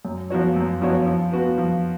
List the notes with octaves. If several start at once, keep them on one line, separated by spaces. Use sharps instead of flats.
F#2
F3 B3 F#4 C#5
F#2
F3 B3 F#4 C#5
F3
B3 F#4 B4
F3